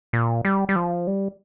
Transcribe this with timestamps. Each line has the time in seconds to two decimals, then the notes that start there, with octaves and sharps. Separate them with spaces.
0.13 A#2
0.45 G3
0.69 G3
0.76 F3
1.07 G3